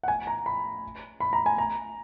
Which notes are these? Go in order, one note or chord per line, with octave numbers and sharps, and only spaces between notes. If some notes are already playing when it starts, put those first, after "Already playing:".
F#5
G#5
A#5
B5
B5
A#5
G#5
A#5